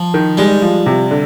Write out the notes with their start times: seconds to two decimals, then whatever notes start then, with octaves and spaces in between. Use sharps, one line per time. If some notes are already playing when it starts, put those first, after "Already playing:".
Already playing: F3
0.14 D#3
0.37 G3 G#3
0.62 F3
0.86 C3
1.11 D3